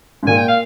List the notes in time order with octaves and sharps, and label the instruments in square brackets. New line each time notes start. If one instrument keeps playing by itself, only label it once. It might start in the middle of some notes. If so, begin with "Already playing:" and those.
[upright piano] G#2
[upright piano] A#2 [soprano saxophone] G#5
[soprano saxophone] G5
F5